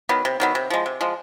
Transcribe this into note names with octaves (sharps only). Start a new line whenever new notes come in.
D#3 F#3 B3
C3
D#3 F#3 B3
C3
F3 G#3
C3
F3 G#3